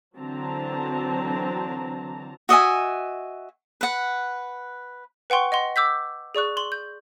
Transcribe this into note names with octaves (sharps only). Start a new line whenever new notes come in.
D3 E3 F#3 C4 A5 A#5
F#4 D#5 E5 G#5
B4 F#5
B4 F#5 G5 C6 C#6
D#5 F#5 C6
D6 E6 G6 B6
G#4 D5 C#6 F#6
C6 F#7
G6